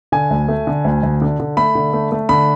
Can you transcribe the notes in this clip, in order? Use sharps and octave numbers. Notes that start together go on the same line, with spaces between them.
D3 G#5
D2
A3
D3
D2
D2
D3
D3
A3 B5
D3
A3
A3
D3 B5